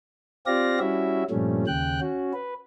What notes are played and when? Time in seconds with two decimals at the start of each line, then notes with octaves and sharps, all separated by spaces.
0.46 C4 F4 G4 D5 F5 A#6
0.79 G3 C#4 E4 F#4 E5
1.30 G2 A#2 F3 G3 A3 C#4
1.67 D#2 C#3 G5 F#6
2.01 C#4 F#4
2.33 B4